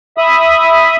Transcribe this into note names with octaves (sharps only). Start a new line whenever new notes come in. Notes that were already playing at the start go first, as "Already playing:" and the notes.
E5 B5 D#6